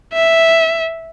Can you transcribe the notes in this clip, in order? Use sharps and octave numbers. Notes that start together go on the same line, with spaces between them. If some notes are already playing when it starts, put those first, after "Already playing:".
E5